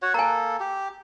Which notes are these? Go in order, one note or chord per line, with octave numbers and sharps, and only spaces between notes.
F#4 C#5 F#5
A#3 A4 G#5 A#5
G4